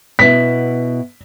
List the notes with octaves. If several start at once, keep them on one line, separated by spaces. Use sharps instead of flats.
B2 B3 E4 B6